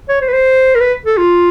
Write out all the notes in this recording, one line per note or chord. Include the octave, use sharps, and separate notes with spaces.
C#5
C5
B4
C5
A#4
B4
A4
F4